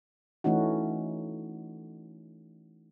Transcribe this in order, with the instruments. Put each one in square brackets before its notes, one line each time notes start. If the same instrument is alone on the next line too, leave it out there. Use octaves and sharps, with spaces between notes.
[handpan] E3 A3 C#4 D#4 F#4